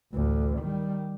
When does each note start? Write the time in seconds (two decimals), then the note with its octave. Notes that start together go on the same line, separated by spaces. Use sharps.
0.13 A1 D2
0.59 D#3 G3